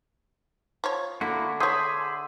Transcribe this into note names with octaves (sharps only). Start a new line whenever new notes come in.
F3 C#5
D3 A#3 E4 F#4
G#4 A4 C#5 E5 B5 C6 D#6 G6